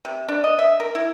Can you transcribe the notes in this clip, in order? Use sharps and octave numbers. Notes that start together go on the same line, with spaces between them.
C3
D4
D#5
E5
A#4
E4